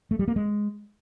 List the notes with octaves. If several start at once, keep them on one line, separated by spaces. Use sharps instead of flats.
A3
G3
A#3
G#3